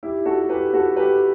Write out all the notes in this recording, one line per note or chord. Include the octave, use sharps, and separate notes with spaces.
E4 G4
F#4 A4
G4 B4
F#4 A4
G4 B4